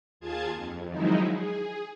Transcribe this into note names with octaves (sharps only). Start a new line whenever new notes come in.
D#2 F4 G#4 A5 G#6
F2
D#3 F3 F#3 G#3 D#4 E4
G#4